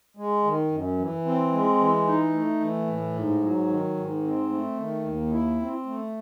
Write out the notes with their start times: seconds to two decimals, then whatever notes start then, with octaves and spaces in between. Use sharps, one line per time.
0.17 G#3
0.44 D#3
0.71 F#2
0.98 E3
1.25 C4
1.52 G#3
1.79 E3
2.07 D#4
2.33 A3
2.61 E3
2.87 A2
3.14 G#2
3.42 F#3
3.69 D#3
3.96 G#2
4.23 C4
4.49 A3
4.77 D#3
5.04 D#2
5.32 E4
5.58 C4
5.86 A3